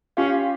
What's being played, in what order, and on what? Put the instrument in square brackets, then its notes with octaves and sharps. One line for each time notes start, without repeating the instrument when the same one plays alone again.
[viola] C#4 [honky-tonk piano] F4 G4